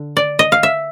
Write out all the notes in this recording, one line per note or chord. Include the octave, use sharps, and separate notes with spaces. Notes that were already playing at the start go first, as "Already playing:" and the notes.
Already playing: D3
D5
D#5
F5
E5